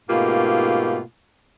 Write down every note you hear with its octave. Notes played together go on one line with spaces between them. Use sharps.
G#2 B2 A3 A#3 F4 G4